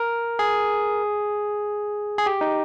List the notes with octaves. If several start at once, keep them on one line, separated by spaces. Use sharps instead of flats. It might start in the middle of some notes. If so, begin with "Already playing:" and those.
Already playing: A#4
G#4
G#4
G4
D#4